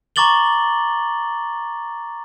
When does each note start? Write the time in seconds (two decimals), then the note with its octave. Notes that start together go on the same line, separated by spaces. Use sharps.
0.16 A#5 C#6 D6 A6 F#7 G7